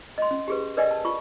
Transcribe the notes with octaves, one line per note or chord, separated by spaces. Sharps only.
D#5 C6
C#4
G4 G#4 B4
A#4 B4 D5 D#5 G5 G#5
A5
F4 C#6